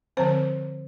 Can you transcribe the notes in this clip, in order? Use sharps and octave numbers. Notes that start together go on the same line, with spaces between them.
D3 F3 C4 C5